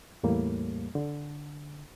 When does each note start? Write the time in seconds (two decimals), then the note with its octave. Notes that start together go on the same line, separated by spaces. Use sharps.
0.23 E2 A2 G3 A#3
0.95 D3